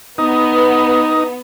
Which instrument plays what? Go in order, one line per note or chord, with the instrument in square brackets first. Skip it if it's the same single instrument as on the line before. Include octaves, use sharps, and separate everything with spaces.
[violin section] B3 [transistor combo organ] D#4